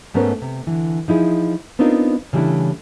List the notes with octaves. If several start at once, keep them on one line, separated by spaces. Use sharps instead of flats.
G#2 A3 B3 C#4 A#4 C5
C3
D3 E3
F3 D#4 E4 G#4
B3 C4 D4 D#4 F4 A#4
C#3 E3 G3 A3 D4 E4